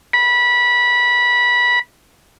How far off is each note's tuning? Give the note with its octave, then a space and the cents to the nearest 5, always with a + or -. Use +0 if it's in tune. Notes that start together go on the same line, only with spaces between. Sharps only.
B5 -20